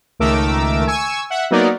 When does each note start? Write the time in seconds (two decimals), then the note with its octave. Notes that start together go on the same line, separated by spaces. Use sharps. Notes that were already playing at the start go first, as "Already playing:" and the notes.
0.19 C#2 D#3 A3 A#4 D6 E6
0.87 G#5 C#6 E6 G#6
1.30 E5 F#5
1.51 F#3 A#3 B3 D#4 A#4 D5